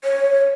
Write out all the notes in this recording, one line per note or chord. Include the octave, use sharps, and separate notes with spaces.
C#5